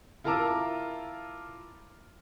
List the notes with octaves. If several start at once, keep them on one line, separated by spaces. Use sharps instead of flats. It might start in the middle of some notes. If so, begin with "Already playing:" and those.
E4 F4 A#4 A5 A#5 D6